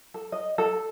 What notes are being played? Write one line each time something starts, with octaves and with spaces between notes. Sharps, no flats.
A4
D#5
A4